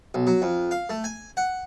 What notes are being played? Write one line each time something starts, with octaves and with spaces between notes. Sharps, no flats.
B1
F#3
F2
F5
A3
G#5
F#5